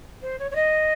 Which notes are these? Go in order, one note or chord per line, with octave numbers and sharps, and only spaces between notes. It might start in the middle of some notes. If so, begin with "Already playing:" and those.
C5
C#5
C#5
D#5